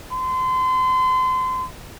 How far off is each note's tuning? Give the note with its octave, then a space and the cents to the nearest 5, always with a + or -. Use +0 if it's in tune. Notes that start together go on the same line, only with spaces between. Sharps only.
C6 -30